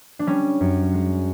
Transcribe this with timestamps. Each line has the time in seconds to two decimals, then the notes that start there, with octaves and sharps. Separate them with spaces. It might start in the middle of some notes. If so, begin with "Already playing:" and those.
0.19 D4
0.27 G3 C#4
0.61 F#2
0.94 G#3